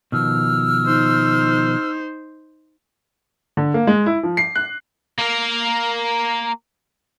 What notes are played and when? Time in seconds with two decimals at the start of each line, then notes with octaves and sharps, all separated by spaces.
0.12 B2 D#3 F3 E6 F6
0.86 D#4 C5
3.57 D3
3.74 A#3
3.87 G#3
4.06 E4
4.23 F3
4.37 C7
4.55 F#6
5.18 A#3 A#4